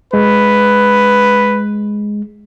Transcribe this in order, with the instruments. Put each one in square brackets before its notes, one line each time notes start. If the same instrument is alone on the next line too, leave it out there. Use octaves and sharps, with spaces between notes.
[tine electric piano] G#3 [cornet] B4